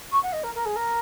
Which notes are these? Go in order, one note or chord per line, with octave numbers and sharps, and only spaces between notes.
C#6
F#5
D#5
A#4
A#4
G#4
A#4